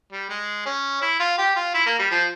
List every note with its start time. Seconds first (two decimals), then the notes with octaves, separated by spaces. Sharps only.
0.12 G3
0.29 G#3
0.65 C#4
1.02 E4
1.20 F4
1.38 G4
1.56 F4
1.75 E4
1.86 A#3
1.99 G3
2.11 F3